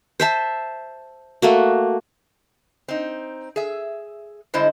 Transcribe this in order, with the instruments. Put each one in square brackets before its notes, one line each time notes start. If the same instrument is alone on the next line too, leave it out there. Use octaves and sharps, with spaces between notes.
[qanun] C5 E5 A5
A3 A#3 F#4
[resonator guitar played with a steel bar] C4 D#4
G#4 E5
G2 D3 G#3 E4 C5 D#5